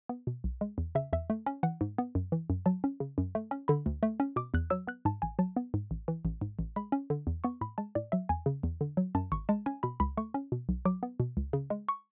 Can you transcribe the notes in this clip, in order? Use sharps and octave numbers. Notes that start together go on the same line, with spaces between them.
B3
B2
B1
G#3
E2
C#3 E5
E2 E5
A3
C#4
E3 F#5
G#2
B3
F#2
E3
F#2
F#3 A5
C#4
C#3
F#2
A3
C#4
D3 B5
D2
A3
C#4
B2 D6
E2 F#6
F#3 E6
B3 F#6
G#2 A5
A1 G#5
F#3 A5
B3
G#2
A1
E3
A1
G#2
A1
G#3 B5
C#4
D3
E2
B3 C#6
A2 B5
G#3 A5
A2 D5
F#3 E5
E2 G#5
C#3
E2
D3
F#3
F#2 A5
G#1 C#6
G#3 A5
C#4 G#5
B2 B5
C#2 B5
A3 C#6
C#4
B2
B1
F#3 D6
B3
B2
C#2
C#3
G#3
C#6